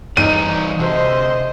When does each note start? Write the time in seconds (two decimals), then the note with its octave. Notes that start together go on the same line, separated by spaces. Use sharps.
0.17 E3 G3 D#4 D5 D#7
0.79 D2 C3 C5 D#5